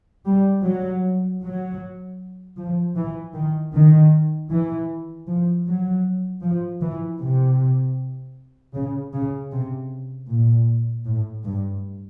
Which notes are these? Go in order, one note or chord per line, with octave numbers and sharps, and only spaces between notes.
G3
F#3
F#3
F3
E3
D#3
D#3
E3
F3
F#3
F3
E3
C3
C#3
C#3
C3
A#2
A2
G2